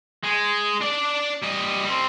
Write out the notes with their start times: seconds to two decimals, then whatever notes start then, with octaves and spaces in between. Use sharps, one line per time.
0.23 G#3
0.81 D4 D5
1.43 G3 D#5
1.85 G3 C4